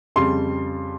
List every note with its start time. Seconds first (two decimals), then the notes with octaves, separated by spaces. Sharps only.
0.16 F2 C#3 G3 C6